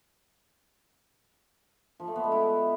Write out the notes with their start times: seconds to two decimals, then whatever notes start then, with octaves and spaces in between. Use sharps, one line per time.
2.00 F3
2.08 A3
2.16 B3
2.24 G#3
2.32 E4